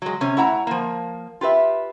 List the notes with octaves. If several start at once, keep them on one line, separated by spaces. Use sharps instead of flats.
F#3 G#3
C3 C#4
A3 E4 F#5 A#5
F3 A#3
F4 G4 B4 E5